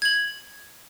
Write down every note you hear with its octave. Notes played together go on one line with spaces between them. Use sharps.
G#6 F#7